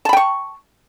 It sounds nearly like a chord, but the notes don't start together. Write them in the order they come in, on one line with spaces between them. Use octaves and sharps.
A5 B5 G5 C#6